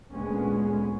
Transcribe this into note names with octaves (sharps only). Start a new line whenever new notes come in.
D2 A#2 G#3 B3 C#4